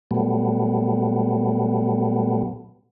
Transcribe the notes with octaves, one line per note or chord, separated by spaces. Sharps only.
A#2 F#3 G3 A3 B3